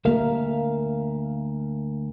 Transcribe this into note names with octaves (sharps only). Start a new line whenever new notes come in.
D2 A#3 A#4 E5 F5